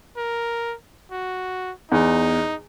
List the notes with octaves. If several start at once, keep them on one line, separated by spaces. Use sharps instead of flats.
A#4
F#4
E2 D#4